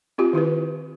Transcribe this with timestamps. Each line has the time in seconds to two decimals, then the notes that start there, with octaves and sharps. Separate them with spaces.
0.18 C4 F4 G4
0.33 D#3 E4 G4 B4